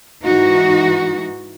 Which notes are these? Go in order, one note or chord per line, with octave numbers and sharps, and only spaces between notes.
G#2 E3 D#4 F#4